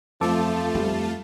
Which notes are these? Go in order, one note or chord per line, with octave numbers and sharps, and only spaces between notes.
F2 F3 A3 F4 A4 A5 D6
G3